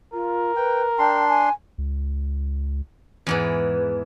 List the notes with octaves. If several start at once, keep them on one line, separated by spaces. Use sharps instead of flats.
F4 A#4
B4 G5
D4 G5 A5 C6
G#5
C#2
E2 G#2 E3